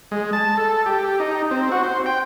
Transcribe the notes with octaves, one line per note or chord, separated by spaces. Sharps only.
G#3
A5
A4
G4
D#4
C4
F#4
C5
G5